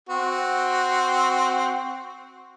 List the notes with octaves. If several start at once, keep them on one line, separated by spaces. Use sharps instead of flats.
C4 F#4